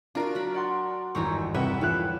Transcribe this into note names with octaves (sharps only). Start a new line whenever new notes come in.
D4 F4 F#4 A#4
F#3 B5
D5 F#5 C6
G1 E2 G#2 D#3 D#4 C#5 C#6
C2 B4 C#5 E5 F#5 G5
E3 F3 G3 E4 F5 F#6 E7